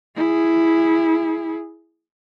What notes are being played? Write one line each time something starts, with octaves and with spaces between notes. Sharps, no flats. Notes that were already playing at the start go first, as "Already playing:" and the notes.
E4 G#4